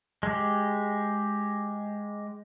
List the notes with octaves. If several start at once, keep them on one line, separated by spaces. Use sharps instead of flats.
G#3 G4